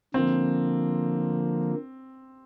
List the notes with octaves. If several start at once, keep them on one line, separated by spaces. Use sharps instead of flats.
D3 F3 A#3 C4